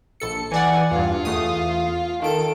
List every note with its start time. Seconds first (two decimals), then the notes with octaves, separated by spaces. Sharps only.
0.20 A#1 A4 C#7
0.52 E3 D5 F#5 G#5
0.91 E2 G2 F4
1.25 E2 A3 D#6
2.22 D#3 A4 D7